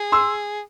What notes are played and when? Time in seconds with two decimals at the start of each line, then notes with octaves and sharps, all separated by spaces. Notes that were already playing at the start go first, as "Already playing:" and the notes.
Already playing: G#4
0.12 C6 E6